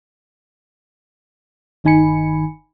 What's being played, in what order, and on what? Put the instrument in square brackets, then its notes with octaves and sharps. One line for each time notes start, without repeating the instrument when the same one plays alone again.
[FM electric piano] G1 D#3 D#4 G#5 B5 C#7